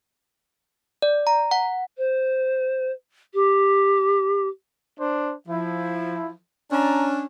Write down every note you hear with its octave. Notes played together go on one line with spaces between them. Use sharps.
D5
A#5
F#5
C5
G4
D4 C5
F3 E4
C#4 D4 A5 A#5